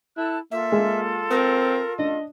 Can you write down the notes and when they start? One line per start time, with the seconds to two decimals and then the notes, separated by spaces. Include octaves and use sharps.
0.17 E4 A4 A5 F#6
0.51 A#3 F4 A4 E5
0.72 G#3
1.30 C4 A#4
1.99 D4 D#5